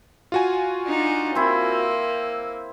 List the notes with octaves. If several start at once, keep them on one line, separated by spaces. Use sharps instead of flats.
F4 F#4 G#5
D4 D#4
A#3 C4 E4